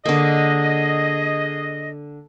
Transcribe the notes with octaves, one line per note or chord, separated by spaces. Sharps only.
D3 A#3 G#4 D#5